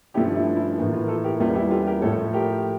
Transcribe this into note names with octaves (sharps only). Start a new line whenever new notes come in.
G2 F3 A3 C#4 E4 G4
E4
E4
A2 E3 A#3
F4
A#4
F4 A4
G4 A#4
E2 E3 G3 A#3 C#4 F4
E4 G4
F4 A4
G4 A#4
A2 F3 A3 A4 C#5
G4 A#4